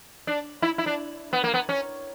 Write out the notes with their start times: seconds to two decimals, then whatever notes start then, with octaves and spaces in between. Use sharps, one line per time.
0.27 D4
0.62 E4
0.78 E4
0.86 D4
1.33 B3
1.44 A#3
1.54 B3
1.69 C#4